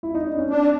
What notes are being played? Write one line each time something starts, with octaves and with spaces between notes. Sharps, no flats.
E4
D#4
D4
C#4
C4 D4